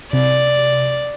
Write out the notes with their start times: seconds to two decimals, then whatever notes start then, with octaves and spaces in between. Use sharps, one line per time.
0.13 C3 D5